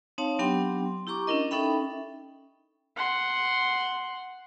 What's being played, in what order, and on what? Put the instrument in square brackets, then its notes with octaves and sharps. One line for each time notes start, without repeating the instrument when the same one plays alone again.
[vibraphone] C4 D#4 C#5 F5 A5
F#3 B3 D4 G4 G5 C6
E4 G4 A#5 C#6 D6
C#4 D4 E4 A#4 D#5
C#4 D#4 A4 E5 G5 B5
[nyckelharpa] F#5 C6